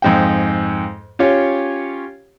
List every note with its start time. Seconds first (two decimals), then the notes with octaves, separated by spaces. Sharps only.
0.02 F2 G#2 G5
1.19 C#4 F4 G4 C#5